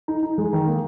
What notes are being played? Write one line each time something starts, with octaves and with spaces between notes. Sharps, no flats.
D#4
D#4
G#3
D#3
A#3